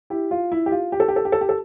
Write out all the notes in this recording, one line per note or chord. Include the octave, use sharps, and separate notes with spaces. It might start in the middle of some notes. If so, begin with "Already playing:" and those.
E4 G4
F4
E4
G4
F4
G4
A4
G4
A4
G4
A4
G4
A4